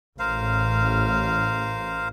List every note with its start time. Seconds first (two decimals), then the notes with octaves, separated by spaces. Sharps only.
0.19 A1 A#4 C5 F5